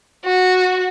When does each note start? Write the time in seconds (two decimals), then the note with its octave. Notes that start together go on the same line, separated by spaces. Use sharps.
0.25 F#4